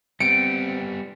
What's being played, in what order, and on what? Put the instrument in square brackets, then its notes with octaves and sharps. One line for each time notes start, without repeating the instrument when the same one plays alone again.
[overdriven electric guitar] G3 B3 [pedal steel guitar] C4 [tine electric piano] C#7 [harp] D7